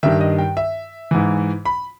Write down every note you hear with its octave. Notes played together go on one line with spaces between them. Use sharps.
G2 D#3 E5
D#5
G5
E5
G#2 E3
B5